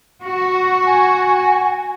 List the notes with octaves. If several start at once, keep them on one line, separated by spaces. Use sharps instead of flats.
F#4
G#5